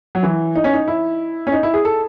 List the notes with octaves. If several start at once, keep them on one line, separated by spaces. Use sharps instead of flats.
F#3
E3
D#4
C#4
D#4
E4
C#4
D#4
E4
G#4
A4